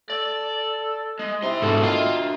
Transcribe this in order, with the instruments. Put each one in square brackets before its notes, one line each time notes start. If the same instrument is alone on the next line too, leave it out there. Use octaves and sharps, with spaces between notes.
[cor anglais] A4 [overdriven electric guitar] D5
[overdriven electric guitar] G#3 [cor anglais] D#5
[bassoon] C3 [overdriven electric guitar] D#4 C6 [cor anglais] E4
[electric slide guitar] G#2 B2 G#3 [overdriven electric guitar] D4 F#4 [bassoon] A4
[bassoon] D#3 [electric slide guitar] F4